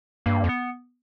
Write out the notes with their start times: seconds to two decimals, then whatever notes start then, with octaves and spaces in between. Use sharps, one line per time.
0.26 G2 A#3
0.44 F2
0.49 B3